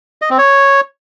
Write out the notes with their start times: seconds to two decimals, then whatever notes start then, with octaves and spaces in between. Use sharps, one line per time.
0.22 D#5
0.30 C4
0.38 C#5